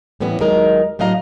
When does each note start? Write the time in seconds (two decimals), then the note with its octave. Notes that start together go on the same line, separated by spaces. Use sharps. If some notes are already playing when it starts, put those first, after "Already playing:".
0.20 A2 E3 G3 B3 C#4
0.40 D#2 F#3 G#3 D#4 A#4 D#5
0.99 A2 F#3 D4 D#5 F5 A#5